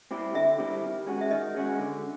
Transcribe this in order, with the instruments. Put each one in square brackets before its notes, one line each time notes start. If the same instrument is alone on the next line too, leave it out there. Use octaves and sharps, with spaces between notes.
[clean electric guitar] G3 C4 E4 G4
[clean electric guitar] D3 [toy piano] E5
[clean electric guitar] G3 C4 E4 G4
D#3
G#3 C#4 F#4
[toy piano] E5
[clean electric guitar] D#3 [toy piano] D#5
[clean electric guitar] G#3 C#4 F#4
D3